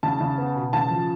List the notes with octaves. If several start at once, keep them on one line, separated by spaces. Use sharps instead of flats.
C#3 A5
C#3
B3
B2
C#3 A5
F3